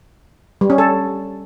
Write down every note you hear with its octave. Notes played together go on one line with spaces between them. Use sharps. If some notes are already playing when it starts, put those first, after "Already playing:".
G3
C#4
A4